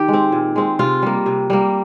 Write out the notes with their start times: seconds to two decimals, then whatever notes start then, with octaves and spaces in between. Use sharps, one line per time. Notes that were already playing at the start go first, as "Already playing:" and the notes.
Already playing: D#3 G4
0.08 G#3
0.13 C4
0.32 A#2
0.56 G#3 C4
0.79 C3 F4
1.02 G3 A#3
1.26 C3
1.50 G3 A#3